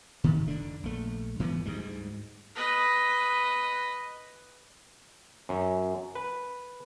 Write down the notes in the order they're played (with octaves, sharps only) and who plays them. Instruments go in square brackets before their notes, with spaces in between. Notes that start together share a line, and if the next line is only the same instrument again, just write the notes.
[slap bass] A2 D#3
F1 D3 D4
A#1 A3
G2 E3 F3 B3
D2 G#2 G3 G#3
[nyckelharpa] B4 D#5
[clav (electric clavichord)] F#2
B4